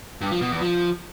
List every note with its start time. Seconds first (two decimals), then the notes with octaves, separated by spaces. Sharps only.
0.21 G2
0.31 F3
0.41 B2
0.51 E2
0.62 F3